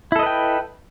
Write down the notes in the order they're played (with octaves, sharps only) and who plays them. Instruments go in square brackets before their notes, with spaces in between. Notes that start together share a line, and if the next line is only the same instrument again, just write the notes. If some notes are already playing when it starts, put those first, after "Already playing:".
[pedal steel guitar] E4
A4
D#5
B4
G5